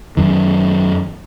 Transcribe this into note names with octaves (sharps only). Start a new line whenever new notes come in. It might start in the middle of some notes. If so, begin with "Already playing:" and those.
F#2 D#3